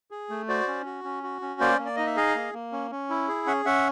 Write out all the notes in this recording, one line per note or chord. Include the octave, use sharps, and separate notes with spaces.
G#4
A3
F#4 C5 D5
C#4
F#4
C#4
F#4
C#4
A#3 C5 D5
A#3
D5
D#4 D#5
E5
G#4 D#5 F5
A#3
A#3
C#4
C#4
E4
G#4
C#4 E5 F#5
C#4 E5 F#5